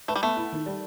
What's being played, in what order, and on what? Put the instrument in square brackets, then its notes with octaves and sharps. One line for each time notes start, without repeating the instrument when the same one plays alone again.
[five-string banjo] A3 [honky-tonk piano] B4
[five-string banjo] G3
[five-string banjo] A3 [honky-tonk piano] B3
[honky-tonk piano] E4
D#3
G3